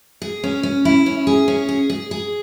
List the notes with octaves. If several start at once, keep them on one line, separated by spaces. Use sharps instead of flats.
G#4
C#4
C#4
E4
C#4
G#4
C#4
G#4
G#4
G#4